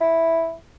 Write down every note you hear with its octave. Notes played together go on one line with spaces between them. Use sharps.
E4